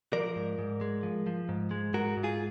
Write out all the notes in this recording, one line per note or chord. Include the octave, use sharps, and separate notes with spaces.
F3 A#4 D5
G#2
G#2
G#3
F3
F3
G#2
G#3
G#2 F#4 A#4
G#2
F4 G#4